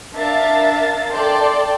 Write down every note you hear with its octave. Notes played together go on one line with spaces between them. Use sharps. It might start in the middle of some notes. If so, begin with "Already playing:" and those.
D4 A#4 E5 F5 A6
A4 D5 G5 A5 C6